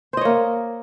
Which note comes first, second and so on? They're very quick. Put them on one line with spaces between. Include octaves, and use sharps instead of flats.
C5 D#5 C#5 A#3